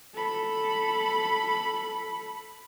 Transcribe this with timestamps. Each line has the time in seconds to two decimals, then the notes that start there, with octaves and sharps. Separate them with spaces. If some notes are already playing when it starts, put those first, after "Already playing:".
0.15 A4 B5